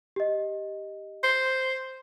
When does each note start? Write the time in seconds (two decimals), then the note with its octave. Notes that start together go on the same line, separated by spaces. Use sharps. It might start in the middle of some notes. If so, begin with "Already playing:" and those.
0.16 G4 D#5
1.24 C5